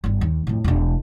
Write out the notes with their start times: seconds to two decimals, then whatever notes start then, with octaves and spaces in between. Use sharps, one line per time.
0.04 G1 G3
0.21 D#2
0.47 F2 A2
0.64 E1 D4